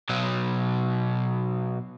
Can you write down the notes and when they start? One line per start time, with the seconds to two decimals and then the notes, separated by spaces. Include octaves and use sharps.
0.09 B2 F#3